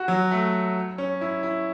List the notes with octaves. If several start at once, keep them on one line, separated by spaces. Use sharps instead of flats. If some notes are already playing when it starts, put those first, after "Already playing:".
Already playing: F#4
F#3
A3
C#4
E4
E4